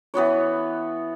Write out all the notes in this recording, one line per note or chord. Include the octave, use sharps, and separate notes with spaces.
E3 B3 F#4 C#5